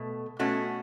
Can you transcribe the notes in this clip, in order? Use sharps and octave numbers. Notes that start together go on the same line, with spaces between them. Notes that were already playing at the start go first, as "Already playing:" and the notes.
Already playing: B2 A3
B2 A3 C#4 F#4